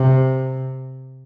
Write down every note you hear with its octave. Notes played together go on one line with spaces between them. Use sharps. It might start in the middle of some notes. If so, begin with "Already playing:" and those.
Already playing: C3